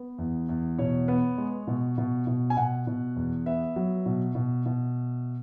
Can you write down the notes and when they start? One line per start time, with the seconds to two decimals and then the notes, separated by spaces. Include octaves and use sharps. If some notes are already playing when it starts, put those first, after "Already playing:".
Already playing: B3
0.18 E2
0.49 E2
0.78 B2 C#5
1.08 B3
1.38 G#3
1.67 B2
1.98 B2
2.27 B2
2.50 G#5
2.57 B2 F#5
2.87 B2
3.16 E2
3.46 B3 E5
3.76 F#3
4.06 B2
4.35 B2
4.66 B2